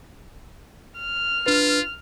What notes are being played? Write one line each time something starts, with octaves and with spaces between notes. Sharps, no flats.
F6
D4 F4 B4